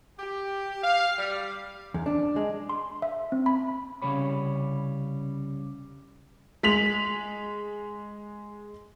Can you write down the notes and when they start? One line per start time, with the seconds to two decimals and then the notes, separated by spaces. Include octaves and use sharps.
0.19 G4
0.82 F5
1.18 G3
1.94 E2
2.06 D4
2.36 G#3
2.69 C6
3.02 E5
3.32 C4
3.46 B5
4.02 C2 C#3 G3 C#5 B5
6.63 G#3 B6 F7 F#7